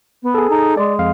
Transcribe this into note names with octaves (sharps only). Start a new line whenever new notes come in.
B3
G#4 A4
D#4
G#3 D5
F2 F5